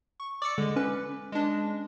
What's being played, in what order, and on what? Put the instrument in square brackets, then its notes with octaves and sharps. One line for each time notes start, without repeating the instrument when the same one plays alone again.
[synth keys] C#6
[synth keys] D5 E6 C#7 [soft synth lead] D6
[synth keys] D3 G#3
[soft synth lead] C#4 [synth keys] B4
[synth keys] G#3 D4